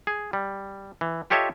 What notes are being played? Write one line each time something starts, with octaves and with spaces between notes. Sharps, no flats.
G#4
G3
E3
F4 G4 A4 C#5 D#5 E5